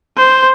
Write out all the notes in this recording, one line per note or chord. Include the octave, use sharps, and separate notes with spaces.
C5